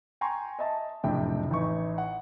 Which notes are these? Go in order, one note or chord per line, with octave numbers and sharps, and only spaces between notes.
G5 G#5 A#5 C6 C#6
D#5 E5 A5
F#1 F2 A2 C3 D4 G5
A1 D#4 E4 B4 C#6
F#5